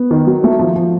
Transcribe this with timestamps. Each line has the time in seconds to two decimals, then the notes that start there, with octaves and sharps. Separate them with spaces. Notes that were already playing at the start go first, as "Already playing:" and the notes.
Already playing: B3
0.11 D#3
0.27 F#3
0.44 A3
0.59 F3
0.76 F3